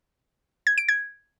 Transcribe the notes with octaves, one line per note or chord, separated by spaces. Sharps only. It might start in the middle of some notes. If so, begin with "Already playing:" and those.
G#6
D7
G#6